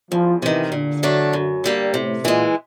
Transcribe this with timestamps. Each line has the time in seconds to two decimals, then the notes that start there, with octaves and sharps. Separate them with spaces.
0.12 E2 F3
0.42 C3 D#3 E3
0.72 A#2 D3
1.03 F#3 A3 D4
1.33 F#2
1.64 D3 G3 A#3
1.94 A2 C3
2.23 A#2 E3 G#3